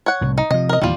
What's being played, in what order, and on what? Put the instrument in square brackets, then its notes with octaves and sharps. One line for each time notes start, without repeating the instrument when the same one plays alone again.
[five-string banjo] C#5 F#5
[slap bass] C2 A2
[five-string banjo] D#4
[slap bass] C3 F3 [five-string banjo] D#5
[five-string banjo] A#4 D#5
[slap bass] E2 A#2 D#3 [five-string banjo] G3 F4